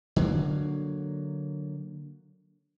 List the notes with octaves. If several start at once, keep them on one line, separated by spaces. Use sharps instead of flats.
D3 F#3 A#3